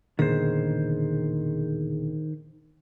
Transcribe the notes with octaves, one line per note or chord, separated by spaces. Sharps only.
E1 A#2 D3 D#3 G#4 C5